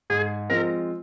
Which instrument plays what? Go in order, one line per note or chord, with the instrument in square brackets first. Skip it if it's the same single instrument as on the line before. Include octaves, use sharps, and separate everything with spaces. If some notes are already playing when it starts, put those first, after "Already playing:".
[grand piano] G#2 [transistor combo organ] G#4
[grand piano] F3 G#3 C4 F4 [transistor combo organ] A#4